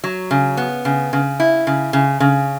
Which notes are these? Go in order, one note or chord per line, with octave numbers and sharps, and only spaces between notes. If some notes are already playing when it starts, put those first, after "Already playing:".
F#3
C#3
B3
C#3
C#3
E4
C#3
C#3
C#3